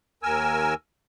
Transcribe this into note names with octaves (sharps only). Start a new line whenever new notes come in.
D#2 A#4 G#5 E6